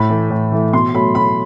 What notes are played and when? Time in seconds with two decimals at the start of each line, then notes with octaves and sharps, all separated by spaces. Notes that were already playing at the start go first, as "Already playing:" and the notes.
Already playing: A2 B5
0.10 E3 A3
0.30 A2
0.52 E3 A3
0.73 B2 C6
0.95 F#3 A3 B5
1.15 B2 B5